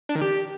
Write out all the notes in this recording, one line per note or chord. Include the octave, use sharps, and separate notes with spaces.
D4
D#3
G4